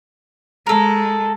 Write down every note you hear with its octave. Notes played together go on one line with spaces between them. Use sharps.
G#3 A4 A#4